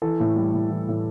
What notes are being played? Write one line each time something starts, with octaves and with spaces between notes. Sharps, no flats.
E3 A4
A2
G3
A2
E3
A2